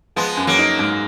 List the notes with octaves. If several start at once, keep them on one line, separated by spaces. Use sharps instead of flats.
F3 G#3 B3
F#2
F#3 A#3
D#4
G#2